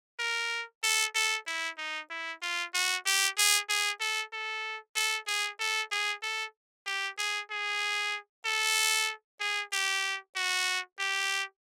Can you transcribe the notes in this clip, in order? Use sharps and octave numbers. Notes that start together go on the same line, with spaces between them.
A#4
A4
A4
E4
D#4
E4
F4
F#4
G4
G#4
G#4
A4
A4
A4
G#4
A4
G#4
A4
G4
G#4
G#4
A4
G#4
G4
F#4
G4